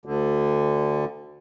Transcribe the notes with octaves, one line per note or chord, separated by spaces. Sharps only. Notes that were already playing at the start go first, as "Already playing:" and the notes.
D2 D3